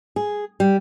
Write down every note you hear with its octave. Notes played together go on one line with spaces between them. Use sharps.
G#4
G3